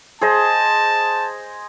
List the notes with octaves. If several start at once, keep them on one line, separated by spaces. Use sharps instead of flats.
G#4 C5 D#5 A5